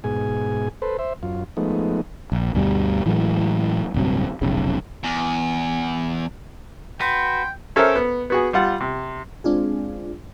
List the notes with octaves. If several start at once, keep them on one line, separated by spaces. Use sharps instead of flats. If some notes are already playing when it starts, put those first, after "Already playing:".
G#2 B2 G#4 G#5
A4 B4 C5
C5 E5
F#2 F4
F3 G#3 A3 B3 D#4
A#1
D2 G2 B2 G3
A2 E3 F#3 G#3
D1 G2 C3 F#3
F1 B1 C#3
E2
F#4 B4 G5 C6
C#4 A4 A#4 C5 E5
B3
B3 F#4 G#4
G3 F4 F#5
C3
G#3 C4 D4 F4 G#4